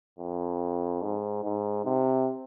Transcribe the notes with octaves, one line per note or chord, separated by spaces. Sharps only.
F2
G#2
G#2
C3